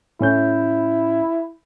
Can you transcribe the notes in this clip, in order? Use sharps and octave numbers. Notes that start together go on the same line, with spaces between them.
A2 C#4 E4 G6